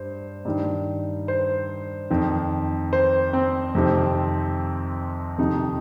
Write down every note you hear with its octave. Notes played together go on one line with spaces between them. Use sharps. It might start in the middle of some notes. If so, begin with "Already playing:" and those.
Already playing: G2 C5
G2 D#3
C5
F2 D#3
C5
C4
F2 C3 D#3
F2 C3 D#3 D#4